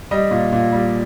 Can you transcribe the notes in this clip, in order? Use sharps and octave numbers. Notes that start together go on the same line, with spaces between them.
G3 D#5
A#2
A#2
G3